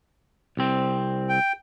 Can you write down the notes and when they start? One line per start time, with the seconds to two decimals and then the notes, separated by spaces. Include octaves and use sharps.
0.57 C2 C4
1.29 G5